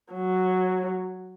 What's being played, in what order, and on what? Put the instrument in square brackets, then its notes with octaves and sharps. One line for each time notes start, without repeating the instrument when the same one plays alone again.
[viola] F#3